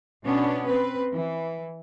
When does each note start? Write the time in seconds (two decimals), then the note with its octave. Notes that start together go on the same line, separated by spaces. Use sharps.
0.24 B2 B3 C#4 D4
0.66 C4 B4
1.12 E3